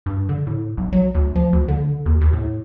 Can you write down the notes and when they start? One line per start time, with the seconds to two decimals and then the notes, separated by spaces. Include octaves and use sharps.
0.06 G2
0.29 D3
0.47 A2
0.77 B1
0.93 F#3
1.15 D2
1.35 F3
1.53 D2
1.68 D3
2.06 D#2
2.21 D#2
2.33 A2